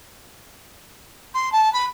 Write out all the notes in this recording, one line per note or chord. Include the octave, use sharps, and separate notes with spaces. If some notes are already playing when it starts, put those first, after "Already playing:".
C6
A5
B5